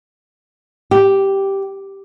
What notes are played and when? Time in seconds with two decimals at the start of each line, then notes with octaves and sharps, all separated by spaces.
0.91 G4